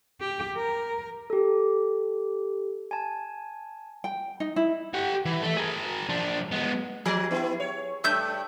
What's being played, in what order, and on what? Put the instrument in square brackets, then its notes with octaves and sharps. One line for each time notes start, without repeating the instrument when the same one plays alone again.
[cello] G4
A#4
[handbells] G4 A4
G#5 A5
[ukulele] G5
D#4
E4
[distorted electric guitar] G4 F#5
E3
A4 E5
G#4 A#4
F3 D4
G#3 B3
[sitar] F3 [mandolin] G#4
[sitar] B3 E4
C#5
[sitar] G2 [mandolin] A3 E5 G6